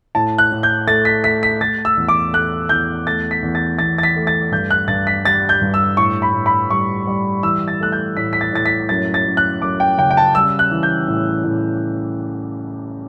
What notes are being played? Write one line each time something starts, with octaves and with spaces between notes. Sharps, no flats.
A2 A5
F#6
A2
G6
A3 A6
B6
A3 B6
B6
A3 A6
E6
E2
D6
A3 F#6
E2 G6
A3 A6
B6
E2
A6
E2 A6
A6
B6
A3
A6
G2 G6
F#6
G2 A6
B6
G3 A6
G6
G2
E6
A2 C#6
B5
A2
B5
G3 C#6
G3
E3 E6
A6
A3 F#6
G6
A2 B6
B6
A6
A2 A6
B6
F#2 A6
A6
F#2
F#6
F#2 D6
G5
C#3 G5
G5
A5
G3 E6
F#6
E3
G6
A2
A2